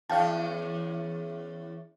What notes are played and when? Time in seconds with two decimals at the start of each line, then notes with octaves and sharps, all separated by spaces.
0.10 E2 C#4 F5 G5 A5